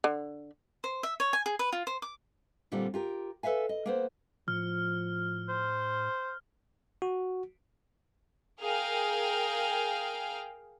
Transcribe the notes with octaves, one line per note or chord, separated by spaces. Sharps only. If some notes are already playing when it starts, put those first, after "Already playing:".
D3
C5
E5
C#5
G#5
G#4
B4
F4
C5
D6
A#2 D3 G3 A#3 C4 F4
F4 G4 A#4
A4 B4 E5 F5 G#5
D#5
A#3 B3 C5
A2 F3 F6
C5
F#4
G#4 A#4 F5 G5